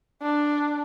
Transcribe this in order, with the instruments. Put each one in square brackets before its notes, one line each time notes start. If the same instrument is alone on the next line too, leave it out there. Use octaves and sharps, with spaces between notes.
[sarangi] D4